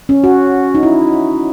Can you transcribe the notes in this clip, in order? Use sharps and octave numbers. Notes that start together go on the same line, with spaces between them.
C#4
F#4
D#4
E4